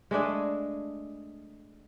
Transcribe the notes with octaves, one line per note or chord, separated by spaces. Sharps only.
G#3 A3 D4 G#4